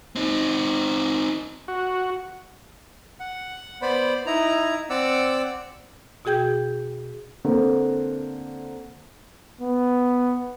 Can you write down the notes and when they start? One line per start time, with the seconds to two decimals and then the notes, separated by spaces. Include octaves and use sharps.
0.16 C4 D#4
1.68 F#4
3.20 F#5
3.82 B3 C5 D5 B5
4.26 D#4 E4 A#5
4.90 C4 D5 F#5 D6 E6
6.25 B2 F#4 G#4 G5 G6 G#6
7.45 D3 A#3 C4
9.61 B3